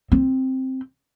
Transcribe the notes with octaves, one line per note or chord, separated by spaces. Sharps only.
C4